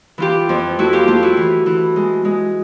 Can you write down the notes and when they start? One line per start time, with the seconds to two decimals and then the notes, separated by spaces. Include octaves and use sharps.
0.18 E3 F4 G4
0.49 F2
0.79 A3 E4 F#4
0.93 F4 G4
1.08 A3 F4 G4
1.23 E4 F#4
1.37 E3
1.66 E3
1.96 G#3
2.25 G#3